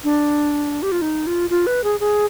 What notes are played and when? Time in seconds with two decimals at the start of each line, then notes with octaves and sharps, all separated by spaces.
0.04 D4
0.82 G4
0.92 F4
1.02 D#4
1.27 F4
1.50 F4
1.67 B4
1.84 G#4
2.00 G#4